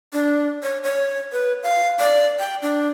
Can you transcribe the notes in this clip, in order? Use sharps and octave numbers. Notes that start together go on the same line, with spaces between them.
D4
C#5
C#5
B4
F5
D5
G5
D4